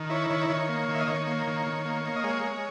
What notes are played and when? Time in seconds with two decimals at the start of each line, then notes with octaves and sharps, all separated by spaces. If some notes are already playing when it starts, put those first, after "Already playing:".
Already playing: D#3
0.10 E4 C#5
0.30 D#3 C#5
0.50 D#3 C#5
0.69 A#3
0.89 D#3
0.94 E5
1.01 D#5
1.08 D#3 C#5
1.27 A#3
1.47 D#3
1.67 D#3
1.85 A#3
2.05 A#3
2.16 D#5
2.24 G#3 C#5
2.44 G#3